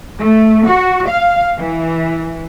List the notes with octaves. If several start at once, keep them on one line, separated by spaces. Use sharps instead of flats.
A3
F#4
F5
E3